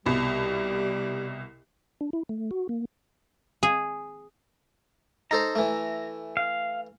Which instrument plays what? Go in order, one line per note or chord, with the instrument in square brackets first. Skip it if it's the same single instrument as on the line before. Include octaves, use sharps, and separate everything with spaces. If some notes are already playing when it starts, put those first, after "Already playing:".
[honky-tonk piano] C2 B2 [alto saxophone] G3
[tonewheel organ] D4
E4
A3
F#4
A#3
[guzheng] G#4
[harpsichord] D#4 A4 C5 [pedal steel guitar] A#5
[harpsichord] E3 A3
[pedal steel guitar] F5